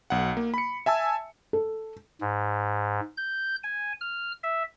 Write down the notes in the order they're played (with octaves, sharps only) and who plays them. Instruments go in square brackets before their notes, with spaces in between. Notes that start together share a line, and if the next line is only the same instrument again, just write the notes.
[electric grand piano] B1 F#5
A#3
B5 C#7
E5 G#5 A5 E6
[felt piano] A4
[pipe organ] G#2
G6
G#5
F6
E5